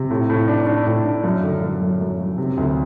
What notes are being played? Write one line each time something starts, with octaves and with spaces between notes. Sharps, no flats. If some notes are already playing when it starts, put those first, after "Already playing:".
Already playing: C3
A2
A2
D4
D4
A2
D4
F#2
D3
F#2
F#2
F#2
F#2
C3
D2